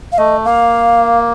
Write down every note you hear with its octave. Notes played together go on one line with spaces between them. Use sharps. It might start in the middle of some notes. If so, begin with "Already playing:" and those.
F5
A3 D#5
A#3 F5